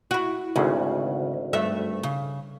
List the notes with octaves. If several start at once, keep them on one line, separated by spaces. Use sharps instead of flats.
E4 F#4
G#1 D2 C#3
G2 A3 E5
C#3